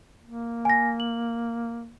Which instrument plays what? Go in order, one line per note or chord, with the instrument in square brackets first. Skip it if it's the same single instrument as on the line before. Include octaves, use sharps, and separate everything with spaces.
[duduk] A#3
[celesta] G#5 A#6
F#7